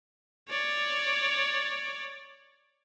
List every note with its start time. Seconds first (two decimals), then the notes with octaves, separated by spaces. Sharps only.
0.49 C#5 D5